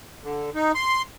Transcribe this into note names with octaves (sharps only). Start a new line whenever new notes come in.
D3
D#4
C6